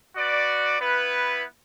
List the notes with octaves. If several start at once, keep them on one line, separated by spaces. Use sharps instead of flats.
F#4 B4 D5
B3 E4 B4